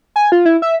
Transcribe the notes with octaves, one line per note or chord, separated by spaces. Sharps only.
G#5
F4
E4
E5